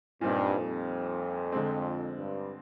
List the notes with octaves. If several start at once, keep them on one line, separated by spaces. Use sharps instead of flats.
G2 A#2 G3 C4 D#4
F2
D3 G#3 C4
G2